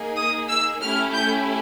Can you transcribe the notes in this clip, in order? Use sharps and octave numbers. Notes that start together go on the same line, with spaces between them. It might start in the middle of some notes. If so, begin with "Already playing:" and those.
Already playing: A#3 D#4 G#4
D#6
E6
A3 C#4 E4 G4 F6
G6